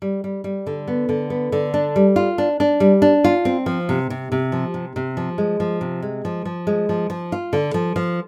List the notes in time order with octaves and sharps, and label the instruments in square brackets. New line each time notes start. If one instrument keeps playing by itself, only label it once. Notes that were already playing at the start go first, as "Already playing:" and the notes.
[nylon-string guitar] G3
G3
G3
D3
B3
D3
B3
D3
D4
G3
F4
D4
D4
G3
D4
F4
C4
F3
C3
C3
C3
F3
C3
C3
F3
G#3
F3
C3
G#3
F3
F3
G#3
F3
F3
F4
D3
F3
F3